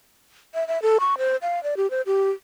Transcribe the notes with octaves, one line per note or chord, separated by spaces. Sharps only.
E5
E5
A4
C#6
C5
F5
D5
G4
C5
G4